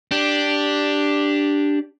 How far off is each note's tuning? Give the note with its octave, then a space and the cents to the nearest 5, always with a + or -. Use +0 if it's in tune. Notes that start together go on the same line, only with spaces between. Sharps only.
D4 +0 G4 +0